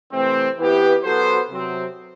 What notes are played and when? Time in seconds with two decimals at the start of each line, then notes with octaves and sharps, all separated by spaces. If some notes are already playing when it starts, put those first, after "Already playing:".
0.12 C3 E3 A3 C4
0.58 E3 B3 E4 G4 B4
1.04 F#3 B3 F#4 A4 C5
1.49 C3 F#3 C4